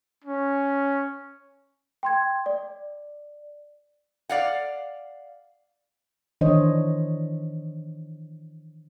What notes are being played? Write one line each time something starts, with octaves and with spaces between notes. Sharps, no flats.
C#4
G5 C6 G#6
D5
D5 F5 F#5
D#3 E3 D4 C5 C#5 D#5